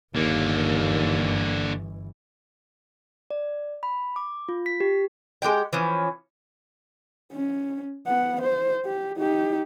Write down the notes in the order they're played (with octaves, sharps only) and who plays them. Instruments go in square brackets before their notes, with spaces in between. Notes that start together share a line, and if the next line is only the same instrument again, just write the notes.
[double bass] G1 E3 [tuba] D#2 [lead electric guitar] D3 A#3
[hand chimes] D5
B5
D6
F4
B6
G4
[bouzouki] G#3 G4 F#5 G5
E3 F3 C#4
[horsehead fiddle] C#4
B3 F#5
C5
G4
D#4 G4